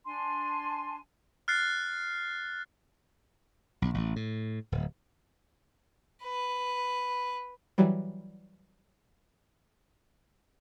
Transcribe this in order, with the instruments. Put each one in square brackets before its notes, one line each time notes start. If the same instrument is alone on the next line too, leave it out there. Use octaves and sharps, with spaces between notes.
[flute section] D4 G#5 A5 C6
[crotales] F6 F#6 A6 C7
[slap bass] B1
A1
A2
D1
[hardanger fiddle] B4
[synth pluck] E3 F#3 G3